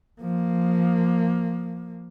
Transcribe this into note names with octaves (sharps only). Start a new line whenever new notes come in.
F3 A#3